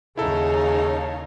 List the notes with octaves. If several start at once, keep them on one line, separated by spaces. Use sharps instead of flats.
D#2 C#3 D#4 E4 G#4 A4 C#5 F5